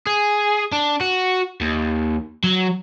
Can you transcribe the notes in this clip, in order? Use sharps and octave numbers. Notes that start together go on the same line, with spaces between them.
G#4
D4
F#4
D#2
F#3